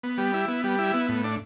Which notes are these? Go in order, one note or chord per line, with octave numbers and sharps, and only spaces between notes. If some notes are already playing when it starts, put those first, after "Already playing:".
B3
G3
E4
B3
G3
E4
B3
A2
D4